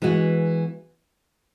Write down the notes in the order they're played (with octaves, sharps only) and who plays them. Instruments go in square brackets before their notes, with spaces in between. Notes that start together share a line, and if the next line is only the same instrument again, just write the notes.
[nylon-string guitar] E3 G#3 B3 F#4